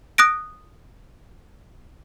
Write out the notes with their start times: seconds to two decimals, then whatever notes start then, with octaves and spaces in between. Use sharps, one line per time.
0.18 D#6 F#6 A#6 D7